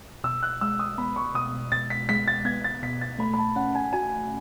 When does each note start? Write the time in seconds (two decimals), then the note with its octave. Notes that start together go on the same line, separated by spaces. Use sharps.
0.24 B2 E6
0.43 F#6
0.61 G#3 E6
0.79 D#6
0.98 B3 B5
1.16 C#6
1.35 B2 D#6
1.72 B2 A6
1.90 B6
2.09 G#3 B6
2.28 A6
2.45 B3 G#6
2.64 A6
2.83 B2 B6
3.01 A6
3.19 A3 B5
3.34 B5
3.38 A5
3.56 C#4 F#5
3.75 G#5
3.93 F#4 G#5